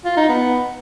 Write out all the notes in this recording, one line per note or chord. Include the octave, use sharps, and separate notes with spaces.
F4
D#4
B3